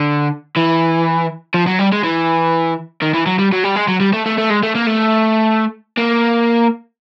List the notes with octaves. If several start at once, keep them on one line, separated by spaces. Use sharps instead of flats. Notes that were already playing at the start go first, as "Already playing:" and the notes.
Already playing: D3
E3
F3
F#3
G3
G#3
E3
D#3
E3
F#3
G3
F#3
G3
G#3
F#3
G3
A3
A3
A3
G#3
A3
A#3
A3
A#3